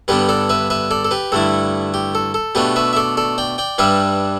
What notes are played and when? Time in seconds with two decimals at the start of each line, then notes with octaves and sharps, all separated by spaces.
0.08 G2 D3 B3 D4 G4 B4
0.29 A4 D5
0.50 B4 E5
0.70 B4 E5
0.91 A4 D5
1.05 A4
1.11 G4 B4
1.32 G2 D3 A3 E4 A4
1.94 G4
2.15 A4
2.34 A4
2.55 B2 A3 D4 G4 B4
2.76 B4 E5
2.93 E5
2.96 A4 D5
3.17 A4 D5
3.38 D5 G5
3.58 D5 G5
3.78 G2 G3 D4 B4 E5